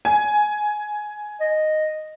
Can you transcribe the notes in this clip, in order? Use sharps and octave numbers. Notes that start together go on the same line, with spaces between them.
G#5
D#5